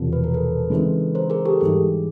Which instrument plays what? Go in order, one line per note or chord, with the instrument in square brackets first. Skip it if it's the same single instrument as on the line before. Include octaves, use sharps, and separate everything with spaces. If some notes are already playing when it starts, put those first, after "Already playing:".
Already playing: [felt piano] E1 E2 C3 F3
[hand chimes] B4
A#4
A4 B4
[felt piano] C#3 E3 G#3 C4 D#4
[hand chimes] A#4 C5
G#4 A#4
G4 A4
[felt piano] G#2 E3 G3 [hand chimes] G#4